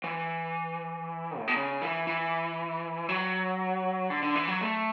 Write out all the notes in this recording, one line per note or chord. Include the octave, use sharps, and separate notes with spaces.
E3
A2
B2
C#3
E3
E3
F#3
D3
D3
E3
F#3
A3